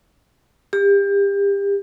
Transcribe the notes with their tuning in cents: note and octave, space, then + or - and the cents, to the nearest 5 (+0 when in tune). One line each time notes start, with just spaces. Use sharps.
G4 +30